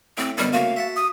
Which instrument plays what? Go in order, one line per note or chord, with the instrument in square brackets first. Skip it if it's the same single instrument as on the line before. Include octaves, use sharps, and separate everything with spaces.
[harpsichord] A2 [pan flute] C4
[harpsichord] F#2 B2 D3 [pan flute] G3
[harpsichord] C#3 A3 A#3 [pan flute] F#4 [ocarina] F5
[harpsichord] E5 F#5 A5
[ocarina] D#6